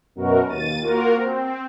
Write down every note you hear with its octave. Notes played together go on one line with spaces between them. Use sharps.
F#2 B2 F#4 A#4
D#2 A6 D#7
A#3 F4 F#4 A#4
C4